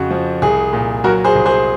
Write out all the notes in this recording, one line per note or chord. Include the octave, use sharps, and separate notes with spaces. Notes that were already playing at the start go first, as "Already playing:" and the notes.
Already playing: F2 C#3 F#4
F3
C2 G#4
A#2
F#3 F#4 A#4
G#4 C5
C2
G#4 C5